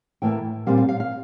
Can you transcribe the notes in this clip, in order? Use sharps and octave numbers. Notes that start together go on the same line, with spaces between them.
A2 E3 A#3 E4 G5
A#2 G3 C4 F5
F5
F5
F5